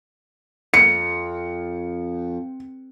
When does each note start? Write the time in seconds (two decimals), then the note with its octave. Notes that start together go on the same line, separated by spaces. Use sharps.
0.74 F2 C#7